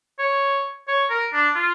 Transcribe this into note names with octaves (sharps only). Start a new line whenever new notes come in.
C#5
C#5
A#4
D4
F4